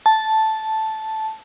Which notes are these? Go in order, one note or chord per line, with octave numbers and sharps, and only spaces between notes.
A5